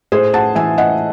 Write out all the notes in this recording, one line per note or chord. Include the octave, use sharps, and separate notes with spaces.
A2 G#4 C5
F#5 A5
E3 E5 G#5
D#5 F#5